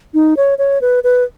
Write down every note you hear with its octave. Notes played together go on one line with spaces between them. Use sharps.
D#4
C#5
C#5
B4
B4